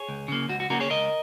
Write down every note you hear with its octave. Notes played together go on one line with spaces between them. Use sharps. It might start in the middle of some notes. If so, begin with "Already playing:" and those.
Already playing: G#4 C#5
C#2
C#3 A#3
C#2 F#4
F#4
C#3 A#3 F#4 A#4
G#4 C#5
C#2 A#4 D#5